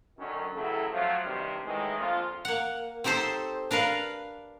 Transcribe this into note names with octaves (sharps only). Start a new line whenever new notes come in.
F#2 D3 D#3 F#3 C#4
A1 C#3 F#3 E4 A4
F3 F#3 A3 F4
G2 C3 D#3
A2 D#3 E3 G#3
A#1 F2 F3 F4
A#3 F#5
C4 D#4 G4 A4 C5
D4 A#4 B4 F5